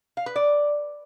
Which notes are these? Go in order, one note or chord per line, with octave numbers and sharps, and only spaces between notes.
F5
B4
D5